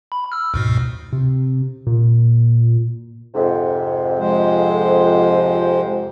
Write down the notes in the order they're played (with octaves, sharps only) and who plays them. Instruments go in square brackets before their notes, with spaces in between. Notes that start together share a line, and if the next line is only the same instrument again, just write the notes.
[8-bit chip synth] B5
E6 F6
D2 G#2 B2
[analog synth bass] C3
A#2
[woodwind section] F2 G#2 C3
[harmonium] F3 G#3 C5